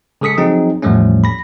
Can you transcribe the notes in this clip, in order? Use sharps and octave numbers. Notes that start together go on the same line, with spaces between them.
C#3 G#3 A4 D#6 B6 C#7
F3 F#3 C4 D#4 G#4
E2 A2 F3 G3 A3 C#4
B5 A#6